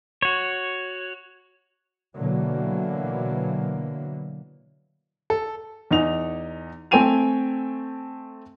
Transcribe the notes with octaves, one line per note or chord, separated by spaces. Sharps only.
F#4 C#5
B2 D3 E3 F#3 A#3
A4
E2 D#4 F7
A3 C4 G5 G#5 D#7 F7